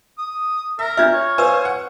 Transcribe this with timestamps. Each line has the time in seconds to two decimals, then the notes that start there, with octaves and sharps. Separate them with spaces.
0.18 D#6
0.79 A#4 E5
0.97 D4 F4 E5 F6 G#6
1.13 C#5
1.38 F4 B4 C5 G#5 E6
1.65 F#5